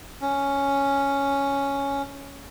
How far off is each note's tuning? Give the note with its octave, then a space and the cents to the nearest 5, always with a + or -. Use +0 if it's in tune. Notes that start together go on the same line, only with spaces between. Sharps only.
C#4 +5